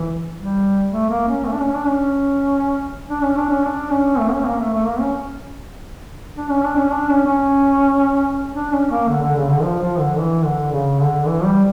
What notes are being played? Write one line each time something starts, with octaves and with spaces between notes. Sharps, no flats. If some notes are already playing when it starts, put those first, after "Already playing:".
Already playing: E3
G3
A3
A#3
C#4
A3
D4
C#4
D4
C#4
D4
C#4
D4
C#4
D4
C#4
A3
C#4
A#3
A3
A3
A#3
C#4
D4
C#4
D4
C#4
D4
C#4
C#4
D4
C#4
A#3
D3
D3
C#3
D3
F3
F3
D3
E3
D3
C#3
D3
E3
G3